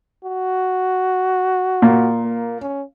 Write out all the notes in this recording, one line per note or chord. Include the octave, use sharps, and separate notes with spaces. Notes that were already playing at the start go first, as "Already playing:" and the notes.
F#4
A#2
A#3
C#4